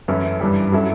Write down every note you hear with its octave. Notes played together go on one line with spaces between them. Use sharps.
F#2 E3 A3 C#4 E4
G2 E3 G3
F#3 C#4 E4 A4